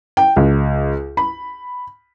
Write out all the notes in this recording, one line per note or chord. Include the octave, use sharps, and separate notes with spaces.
G5
C#2
B5